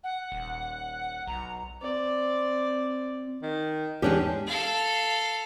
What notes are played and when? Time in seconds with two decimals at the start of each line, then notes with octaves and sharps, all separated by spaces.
0.04 F#5
0.32 D#1
1.27 B1 A#5
1.82 C4 D5
3.43 D#3
4.02 E2 G#2 G#3 C#4 D4 G4
4.47 A4 F5